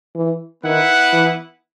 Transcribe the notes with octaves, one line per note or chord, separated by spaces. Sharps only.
E3
D#3 B3 E4 B4 F#5
E3